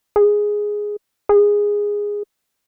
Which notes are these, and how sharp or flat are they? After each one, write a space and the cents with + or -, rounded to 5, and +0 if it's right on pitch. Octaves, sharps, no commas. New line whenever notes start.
G#4 +0
G#4 -10